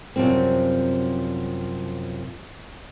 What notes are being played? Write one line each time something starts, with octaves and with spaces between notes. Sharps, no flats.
F#2 C3 F3 G3 C4